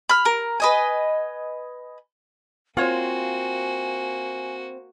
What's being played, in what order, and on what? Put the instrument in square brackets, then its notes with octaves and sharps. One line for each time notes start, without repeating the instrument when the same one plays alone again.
[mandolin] B5 F6
A#4
B4 D#5 G#5
[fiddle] A#3 F#4 [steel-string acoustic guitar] C4 [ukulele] F4 C#5 [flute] G#5